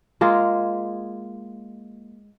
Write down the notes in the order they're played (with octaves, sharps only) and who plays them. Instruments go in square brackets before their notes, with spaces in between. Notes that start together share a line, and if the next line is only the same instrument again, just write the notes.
[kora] G#3 A#3 F4 G#4